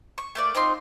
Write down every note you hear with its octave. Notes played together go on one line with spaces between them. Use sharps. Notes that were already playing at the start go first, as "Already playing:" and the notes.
C#6
A3 A#3 D5
C4 D#4 F4 C6